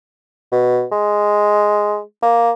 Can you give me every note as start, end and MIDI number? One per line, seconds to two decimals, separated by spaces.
0.52 0.84 47
0.92 2.01 56
2.22 2.51 58